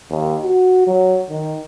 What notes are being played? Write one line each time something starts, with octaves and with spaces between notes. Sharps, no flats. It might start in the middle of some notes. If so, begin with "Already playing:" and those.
D#2
F#4
F#3
D#3